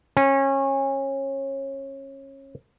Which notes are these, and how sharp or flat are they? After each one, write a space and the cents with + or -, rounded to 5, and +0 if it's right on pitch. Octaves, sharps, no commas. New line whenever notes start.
C#4 -25